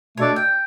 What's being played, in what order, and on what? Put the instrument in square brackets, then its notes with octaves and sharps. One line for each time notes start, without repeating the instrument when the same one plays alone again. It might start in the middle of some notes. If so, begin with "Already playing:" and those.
[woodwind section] B2 A3 D4 A4 D5 [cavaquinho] C#5
[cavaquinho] G5